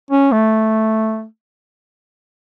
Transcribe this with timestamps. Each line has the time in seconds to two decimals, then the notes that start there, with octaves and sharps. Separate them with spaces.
0.11 C#4
0.32 A3